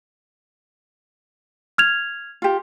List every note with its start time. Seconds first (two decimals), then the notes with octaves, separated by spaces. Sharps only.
1.78 F6 G#6 F7
2.42 F4 G4